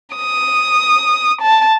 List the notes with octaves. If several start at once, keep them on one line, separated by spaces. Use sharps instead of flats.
D#6
A5